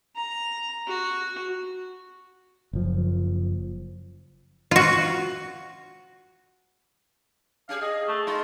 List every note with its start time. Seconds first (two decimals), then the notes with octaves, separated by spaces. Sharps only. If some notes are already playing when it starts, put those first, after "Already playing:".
0.16 A#5
0.88 F#4
2.73 F#1 F3
4.71 F4 F#4
7.69 C#4 G4 G#4 F5
7.82 G#4 D#5
8.08 A3
8.27 A3 D#4 F4 D#5